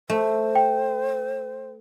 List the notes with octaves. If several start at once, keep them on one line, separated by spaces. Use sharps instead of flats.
A3 C5
G5